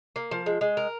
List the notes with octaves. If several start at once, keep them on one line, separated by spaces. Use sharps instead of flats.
A#3
F3
G#3
G#3
A#4